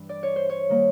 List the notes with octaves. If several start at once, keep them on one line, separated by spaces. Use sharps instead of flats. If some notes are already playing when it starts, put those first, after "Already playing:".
Already playing: G2 E3 G3
D5
C#5
C5
C#5
D#3 G3 A#3